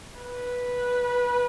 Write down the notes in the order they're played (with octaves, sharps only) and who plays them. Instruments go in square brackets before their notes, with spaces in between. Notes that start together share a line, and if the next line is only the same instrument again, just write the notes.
[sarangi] B4